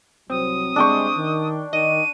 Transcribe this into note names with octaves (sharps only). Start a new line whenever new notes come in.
C2 F#3 C4 D#6
D2 G3 G#3 D4 G5 C#6
D#3
D#3 D#5 D#7